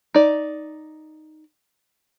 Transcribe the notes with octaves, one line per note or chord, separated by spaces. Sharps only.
D#4 D5